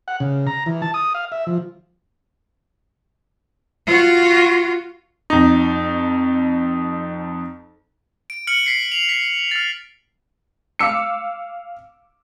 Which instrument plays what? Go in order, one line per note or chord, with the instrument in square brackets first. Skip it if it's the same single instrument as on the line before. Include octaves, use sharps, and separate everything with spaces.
[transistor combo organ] F#5
C#3
A#5
E3
A5
D#6
F5
E5
F3
[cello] F4 F#4
[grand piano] F2 D#4
[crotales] D7
F6 C#7 F#7
B6 C7
F7
B6
F6 A6
[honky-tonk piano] F5 D6 E6 C#7